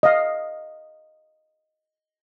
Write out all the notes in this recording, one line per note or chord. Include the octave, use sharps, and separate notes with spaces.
D#5 F5